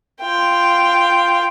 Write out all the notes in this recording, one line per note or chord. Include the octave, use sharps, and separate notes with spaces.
F4 G5